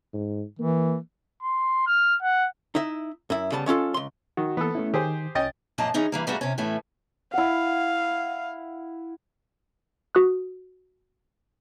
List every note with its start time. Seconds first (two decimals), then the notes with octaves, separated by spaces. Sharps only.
0.13 G#2
0.59 E3 A#3
1.42 C6
1.87 F6
2.22 F#5
2.75 D#4 E4 E5
3.30 F#2 E4
3.52 C#3 G3 B3 A5
3.66 G#3 C#4 F4 A4
3.94 C#2 C6
4.37 D#3 F#4
4.57 E3 A#3 B3 A4
4.75 A3 C#4 E4
4.94 D#3 G4 G#4 C5
5.35 C2 C#4 D#5 G5 A6
5.78 F#2 A#2 F3 A#3 D#5 A5
5.94 E3 C#4 D#4 G#4
6.12 E3 G3 A#3
6.27 G#2 G3 A3 A#3 F#4 E5
6.41 C3 C#4
6.58 A2 E3 A3 C#4
7.34 E4 F5 F#5
10.15 F#4 D#6 F#6